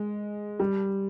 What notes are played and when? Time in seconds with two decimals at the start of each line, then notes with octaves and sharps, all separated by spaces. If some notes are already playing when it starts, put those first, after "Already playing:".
Already playing: G#3
0.60 G3